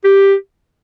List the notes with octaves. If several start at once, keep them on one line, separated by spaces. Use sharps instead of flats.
G4